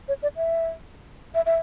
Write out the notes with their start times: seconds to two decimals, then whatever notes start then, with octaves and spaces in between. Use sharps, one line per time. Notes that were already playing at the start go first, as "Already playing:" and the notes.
0.08 C#5
0.23 D5
0.37 E5
1.35 E5
1.46 E5